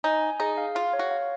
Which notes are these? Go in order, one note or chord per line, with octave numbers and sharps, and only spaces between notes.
D#4 G#5
G#5
D#4 G#4
F5
F4 F5
C#5
F#4
F5